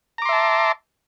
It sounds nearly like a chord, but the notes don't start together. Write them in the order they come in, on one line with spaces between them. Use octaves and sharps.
A#5 D6 C6 E5 A5